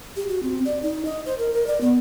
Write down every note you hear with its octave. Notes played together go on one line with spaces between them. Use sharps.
G4
F#4
C4
D5
D#4
D#5
C5
A#4
A#4
D5
B3